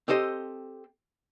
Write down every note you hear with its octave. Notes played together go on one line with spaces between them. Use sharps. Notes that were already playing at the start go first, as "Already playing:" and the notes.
C4 G4 A4 C5 D#5